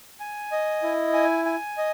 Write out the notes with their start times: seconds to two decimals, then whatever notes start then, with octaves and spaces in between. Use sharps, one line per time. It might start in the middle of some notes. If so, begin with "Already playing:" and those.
0.20 G#5
0.52 D#5
0.83 E4
1.14 G#5
1.45 G#5
1.78 D#5